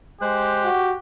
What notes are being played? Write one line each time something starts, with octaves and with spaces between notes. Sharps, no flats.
G#3 G4 C5 F#6
F#4